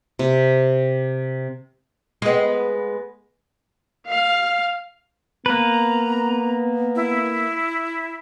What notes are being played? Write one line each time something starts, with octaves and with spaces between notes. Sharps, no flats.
C3
G#3 B3
F5
A#3 B3 B4 A#5
E4